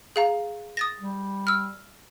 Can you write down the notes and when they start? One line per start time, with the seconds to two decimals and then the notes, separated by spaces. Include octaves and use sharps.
0.16 G#4 F5 A#5
0.77 D#6 A6 A#6
1.00 G3
1.47 E6 F6